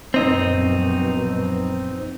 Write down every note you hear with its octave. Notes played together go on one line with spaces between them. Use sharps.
A#1 F#2 B2 C4 D#4